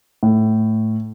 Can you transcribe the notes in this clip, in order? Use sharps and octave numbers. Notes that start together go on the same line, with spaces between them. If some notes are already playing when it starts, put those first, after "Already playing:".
A2